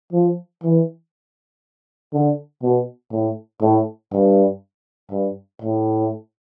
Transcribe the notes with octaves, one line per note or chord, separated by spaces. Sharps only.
F3
E3
D3
B2
A2
A2
G2
G2
A2